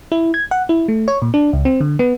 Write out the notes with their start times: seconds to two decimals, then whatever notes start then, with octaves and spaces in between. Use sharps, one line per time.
0.12 E4
0.34 G#6
0.51 F#5
0.69 E4
0.88 A3
1.08 C#5
1.22 A#2
1.34 D4
1.53 C#2
1.65 C4
1.81 D3
1.99 B3